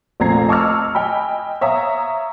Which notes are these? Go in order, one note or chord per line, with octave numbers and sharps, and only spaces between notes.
F1 A#1 C4 A#5 G#6 C7
D#5 A5 C#6 D6 E6 F6
D#5 G5 G#5 B5
C#5 E5 F5 A#5 D#6